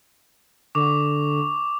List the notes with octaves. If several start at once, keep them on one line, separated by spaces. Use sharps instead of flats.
D3 C#6 D6